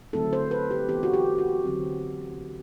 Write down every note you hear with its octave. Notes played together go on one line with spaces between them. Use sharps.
D3 F#3 A3 C4 E4 A4
C5
B4
G4
E3 B3 E4 G4
F#4
G4
F#4
D3 F#3 C4